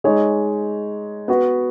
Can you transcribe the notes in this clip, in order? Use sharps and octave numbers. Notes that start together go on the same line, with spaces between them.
G#3 D#4 G#4 C#5
B3 F#4 B4